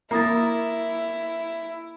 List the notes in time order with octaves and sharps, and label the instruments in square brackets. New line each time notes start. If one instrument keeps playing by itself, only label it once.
[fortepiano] A#3 [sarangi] E4 [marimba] A#4 D#6 A6